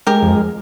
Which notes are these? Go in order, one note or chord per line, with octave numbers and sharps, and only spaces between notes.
G#3 G4 A#4
F2